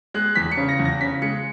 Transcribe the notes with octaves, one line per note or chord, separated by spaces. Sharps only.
G#3 F#6
E2 B6
C#7
C#3
A#6
E2
A#6
C#3 B6
G#3 C#7